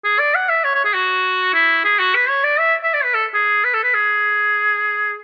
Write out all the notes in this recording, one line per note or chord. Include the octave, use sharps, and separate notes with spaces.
G#4
D5
F#5
E5
C#5
C#5
G#4
F#4
E4
G#4
F#4
B4
C#5
D5
E5
E5
D5
B4
A4
G#4
B4
A4
B4
G#4